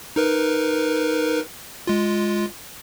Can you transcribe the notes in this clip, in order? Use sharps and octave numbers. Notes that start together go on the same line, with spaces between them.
D#4 A#4 B4
G#3 F4